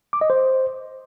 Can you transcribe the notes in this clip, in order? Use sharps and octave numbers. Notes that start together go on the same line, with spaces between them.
D6
D#5
C5